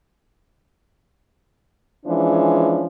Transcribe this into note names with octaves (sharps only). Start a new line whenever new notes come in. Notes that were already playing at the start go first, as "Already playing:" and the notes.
E3 F3 G#3 C#4 D4